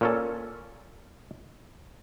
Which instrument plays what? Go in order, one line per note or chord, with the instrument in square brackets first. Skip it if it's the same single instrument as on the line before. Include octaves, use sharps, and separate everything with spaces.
[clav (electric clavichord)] A#2 C#4 A4